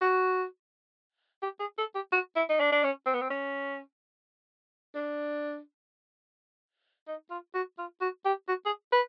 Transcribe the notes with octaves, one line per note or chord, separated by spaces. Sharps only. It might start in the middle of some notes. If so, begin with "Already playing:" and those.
F#4
G4
G#4
A4
G4
F#4
E4
D#4
D4
D4
C#4
C4
B3
C4
C#4
D4
D#4
F4
F#4
F4
F#4
G4
F#4
G#4
B4